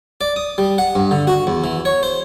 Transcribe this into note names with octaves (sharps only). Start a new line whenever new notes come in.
D5
D#6
G3
F#5
G2
D3
F#4
E2
E3
C#5
C5